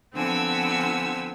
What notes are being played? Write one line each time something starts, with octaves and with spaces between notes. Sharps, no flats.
D3 F3 B3 C4 G#5 E6